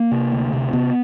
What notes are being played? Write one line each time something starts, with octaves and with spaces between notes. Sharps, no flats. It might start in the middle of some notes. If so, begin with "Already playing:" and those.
Already playing: A#3
C3
D2
C3
C3 B3